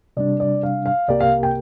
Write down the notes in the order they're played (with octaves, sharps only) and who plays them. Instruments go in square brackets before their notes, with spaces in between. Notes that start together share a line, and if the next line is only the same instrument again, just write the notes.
[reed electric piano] C3 G3 D4 [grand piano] D5
[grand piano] D5
F5
F5
[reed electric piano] C2 C3 A#3 G4 A#4 [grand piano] D5
[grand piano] F5
G5